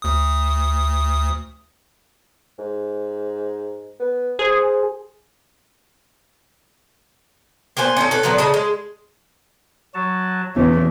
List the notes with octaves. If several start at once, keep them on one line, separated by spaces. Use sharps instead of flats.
D2 D#6
G#2
B3
G#4 C5
A#3 B3 C5 G#5
C#4 D#4 A4
A4 B4
A#2 D3 F#3 B3
C#3 D#5 A5
G#3
F#3 F#4 A5
E2 B2 E3 A3 C#4